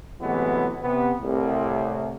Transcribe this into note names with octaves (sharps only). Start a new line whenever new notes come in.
A2 C3 E3 F#3 G#3 B3
C3 B3
C2 A2 C3